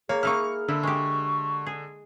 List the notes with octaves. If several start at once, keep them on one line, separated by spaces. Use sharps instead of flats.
A#3 G#4 C#5
A#3 D#4 E4 C#6 F6
D3 E4
G#3 G4 C#6
G#4